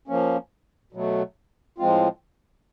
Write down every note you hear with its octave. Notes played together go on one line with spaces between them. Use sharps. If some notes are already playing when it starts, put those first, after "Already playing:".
F3 A#3 C#4
B2 F#3 A3
A2 F3 G#3 C4 F4